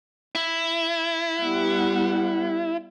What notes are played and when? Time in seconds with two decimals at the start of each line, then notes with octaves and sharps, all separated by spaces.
0.35 E4
1.40 G3 B3 F#5